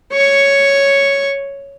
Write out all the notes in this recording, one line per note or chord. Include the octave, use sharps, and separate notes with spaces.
C#5 C#6